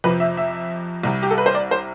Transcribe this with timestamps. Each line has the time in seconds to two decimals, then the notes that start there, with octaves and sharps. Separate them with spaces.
0.04 F2 C3 F3 B4
0.20 E5
0.37 E5
1.03 C2 C3 G3
1.23 G4
1.31 A4
1.38 B4
1.46 C5
1.55 D5
1.71 C5